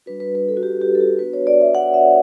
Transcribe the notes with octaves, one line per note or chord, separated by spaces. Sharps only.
G3 D4 F#4 B4
B4
B4
A4
F#4
G4
G4
A4
G4
B3 D4 F#4 B4
C#5
D5
E5
F#5
E5